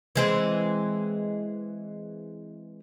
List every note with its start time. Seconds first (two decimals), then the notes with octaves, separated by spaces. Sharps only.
0.16 E3 G#3 C4